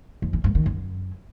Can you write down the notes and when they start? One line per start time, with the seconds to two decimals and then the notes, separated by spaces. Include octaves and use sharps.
0.22 F2
0.33 E3
0.44 G2
0.55 D#3
0.66 F#2